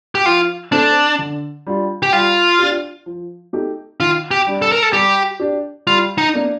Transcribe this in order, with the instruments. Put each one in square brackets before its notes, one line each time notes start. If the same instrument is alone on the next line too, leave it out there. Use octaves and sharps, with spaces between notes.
[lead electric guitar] G4
[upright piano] F3 [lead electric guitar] F4
[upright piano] A3 C4 [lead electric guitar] D4
[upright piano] D3
G3 D4 F4
[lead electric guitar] G4
[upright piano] G3 [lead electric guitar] F4
[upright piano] D4 G4
F3
A3 D#4 G4
[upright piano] D#3 [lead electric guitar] F4
[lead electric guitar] G4
[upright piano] G3 D4
[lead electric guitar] A4
A#4
A4
[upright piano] G3 [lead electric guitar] G4
[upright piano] D4 G4
[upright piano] G3 [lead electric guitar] F4
[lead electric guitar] D#4
[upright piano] A#3 D4